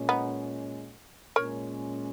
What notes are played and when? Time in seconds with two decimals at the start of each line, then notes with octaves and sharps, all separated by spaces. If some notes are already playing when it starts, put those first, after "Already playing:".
Already playing: A#2 G#3 C#4
0.09 B3 D#4
1.36 A#2 G#3 C#4 A#4 C#5